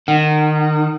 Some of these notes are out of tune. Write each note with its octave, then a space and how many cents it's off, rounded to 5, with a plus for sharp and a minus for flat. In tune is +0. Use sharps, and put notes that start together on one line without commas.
D#3 -25 F#5 +30